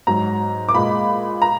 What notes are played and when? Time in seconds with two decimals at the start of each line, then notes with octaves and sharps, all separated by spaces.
0.07 G#2 F#3 A#5
0.69 D6
0.74 A#2 G#3 B5
1.42 A#5